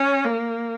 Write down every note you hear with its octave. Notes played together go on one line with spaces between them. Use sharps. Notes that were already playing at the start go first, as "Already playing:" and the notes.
Already playing: C#4
A#3